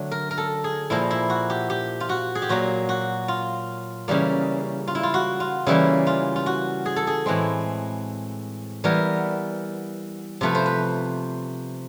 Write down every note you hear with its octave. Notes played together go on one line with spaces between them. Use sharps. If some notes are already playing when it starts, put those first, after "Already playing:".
Already playing: D3 F#3 A3
A#4
A#4
A4
G#4
A#2 F3 A#3 E4
E4
F#4
G4
G4
F4
F#4
G#4
G4
A#2 F#3 A#3 F#4
F#4
F4
C#3 E3 G3 A#3
F4
E4
F4
F#4
F4
C#3 E3 G3 A#3 E4
F4
F4
F#4
G#4
A4
G#4
A2 E3 G#3 C4
E3 G3 B3 A#4
C3 F3 A3 C4 B4
C5
B4